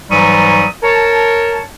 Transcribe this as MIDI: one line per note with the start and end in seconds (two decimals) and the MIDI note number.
0.10 0.65 44
0.10 0.65 52
0.10 0.65 54
0.10 0.65 55
0.10 0.65 85
0.10 0.65 87
0.83 1.60 70
0.83 1.60 73
0.83 1.60 81